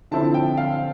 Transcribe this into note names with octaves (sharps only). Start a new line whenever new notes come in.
D3 F3 C4 E4 A5
G5
F5